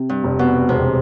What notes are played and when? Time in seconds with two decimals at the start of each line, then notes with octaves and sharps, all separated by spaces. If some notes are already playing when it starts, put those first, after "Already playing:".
Already playing: C3
0.09 G2
0.24 F1
0.39 B2
0.69 E1 C3